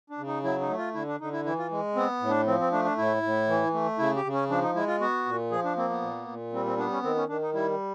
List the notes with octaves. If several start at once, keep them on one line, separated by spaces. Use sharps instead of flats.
D4
C#3
D#4
F#3 E4
D#4
A3
F4
D3 E4
D4
D3 D#4
E4
E3 E4
F4
G#3
B3 C4
A2
D4
F3 C4
C4
A3 D4
D4
A2 E4
A2
E3
A3
C#3 E4
G4
C#3
C#4
F3 D4
D#4
G#3 E4
F4
B3 F#4
A#2
F3 G#4
D4
A#3 C4
B3
A#2
A#2
G3 C4
C4
B3 D4
C#4
D#3 C4
C#4
D#3 D4
D#4
G3 E4